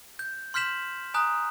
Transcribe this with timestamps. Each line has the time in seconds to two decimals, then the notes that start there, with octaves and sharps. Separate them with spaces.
0.19 G6
0.54 C6 F6 G6 B6 E7 F#7
1.14 G#5 A#5 D#6 F#6